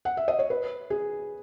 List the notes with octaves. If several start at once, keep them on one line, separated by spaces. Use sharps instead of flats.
F#5
E5
D#5
C#5
B4
G#4